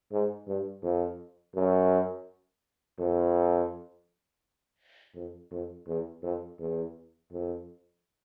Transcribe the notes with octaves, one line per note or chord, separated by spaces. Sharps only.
G#2
G2
F2
F#2
F2
F2
F2
E2
F2
E2
F2